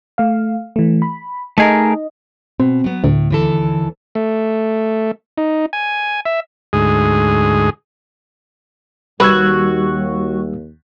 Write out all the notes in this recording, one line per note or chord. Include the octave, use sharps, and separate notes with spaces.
A3 F5
E3 A3
B5
A3 D#4 G#4 A#4 D#5
B2 C4
F#3 B3
D2 A2
D#2 E3 A4
A3
D#4
G#5
E5
D2 G#2 G#4
D#2 G3 F#4 B4 E6 G#6